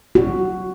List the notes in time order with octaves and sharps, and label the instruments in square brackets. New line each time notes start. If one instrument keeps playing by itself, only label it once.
[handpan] F#4